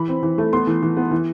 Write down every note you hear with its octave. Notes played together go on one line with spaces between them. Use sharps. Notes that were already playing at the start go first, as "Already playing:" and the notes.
Already playing: E3 B5
C4
E3
A3
B3 C6
E3
E3
B3
E3